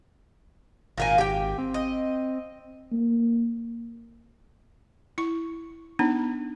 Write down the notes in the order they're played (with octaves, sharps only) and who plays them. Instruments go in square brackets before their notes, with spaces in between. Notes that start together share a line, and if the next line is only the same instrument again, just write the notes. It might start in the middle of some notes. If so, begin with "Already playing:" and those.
[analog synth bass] G#1 [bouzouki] A#2 A#3 G#5
[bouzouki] G4 G5
[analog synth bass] C4
[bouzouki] D#5
[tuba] A#3
[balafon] E4 C#6
B3 D4 D#4